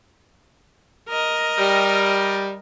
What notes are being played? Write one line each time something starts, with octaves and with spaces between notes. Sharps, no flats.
A#4 D#5
G3